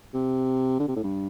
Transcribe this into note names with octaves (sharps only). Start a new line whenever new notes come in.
C3
D3
C3
A2
G2